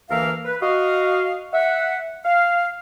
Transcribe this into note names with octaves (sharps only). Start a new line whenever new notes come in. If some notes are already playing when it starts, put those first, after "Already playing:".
D2 E3 A#3 A#4 E5 F5
B4
F#4 D#5 F5
E5 F#5
F5